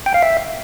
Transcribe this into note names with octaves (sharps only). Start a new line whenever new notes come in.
G5
F5
E5